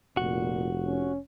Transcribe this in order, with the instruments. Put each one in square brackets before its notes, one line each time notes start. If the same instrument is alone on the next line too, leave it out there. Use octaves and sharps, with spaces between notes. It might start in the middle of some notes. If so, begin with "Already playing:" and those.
[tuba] F1 [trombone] A#2 [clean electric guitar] F#4
[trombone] C#4